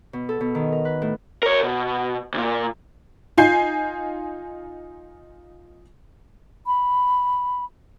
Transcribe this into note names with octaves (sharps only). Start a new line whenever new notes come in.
B2
A4
B2
D#3
A#4
B4
A2
A#4 C#5
B2
D2 A#2
D#4 F4 G#5 G6 C7
B5